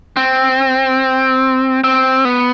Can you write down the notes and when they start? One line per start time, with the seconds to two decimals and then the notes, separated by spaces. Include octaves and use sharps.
0.17 C4
1.84 C4
2.25 B3